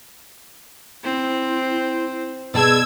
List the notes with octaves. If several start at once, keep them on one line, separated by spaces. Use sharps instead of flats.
C4 E4
B2 G#4 D5 A5 E6 G#6